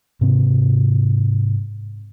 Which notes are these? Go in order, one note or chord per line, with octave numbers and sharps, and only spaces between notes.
G#2 C3 C4